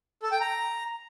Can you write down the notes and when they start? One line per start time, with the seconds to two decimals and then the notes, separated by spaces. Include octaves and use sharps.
0.23 A4
0.32 G5
0.41 A#5